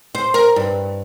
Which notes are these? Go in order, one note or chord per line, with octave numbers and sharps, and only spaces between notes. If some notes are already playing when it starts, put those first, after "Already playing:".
C5
A#4
G2